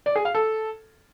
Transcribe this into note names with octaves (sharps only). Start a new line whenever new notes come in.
D5
G#4
F5
A4